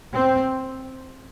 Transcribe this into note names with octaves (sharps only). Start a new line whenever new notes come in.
C4